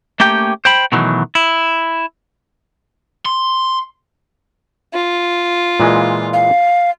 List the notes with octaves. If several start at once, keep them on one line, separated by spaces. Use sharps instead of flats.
A3 A#3 C#4 G4 G5
C5 G5 B5
B2 D#3 E3 F#3 A3
E4
C6
F4
A#2 E3 G#3
F5